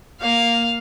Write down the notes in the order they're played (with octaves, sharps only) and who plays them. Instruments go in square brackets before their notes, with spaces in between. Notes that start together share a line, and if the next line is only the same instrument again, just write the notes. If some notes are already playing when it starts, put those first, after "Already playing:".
[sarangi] A#3 [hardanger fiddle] F5